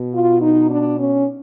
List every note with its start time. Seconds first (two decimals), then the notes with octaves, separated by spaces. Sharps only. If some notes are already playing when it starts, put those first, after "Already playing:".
Already playing: B2
0.13 F4
0.41 D#4
0.70 D4
0.99 C#4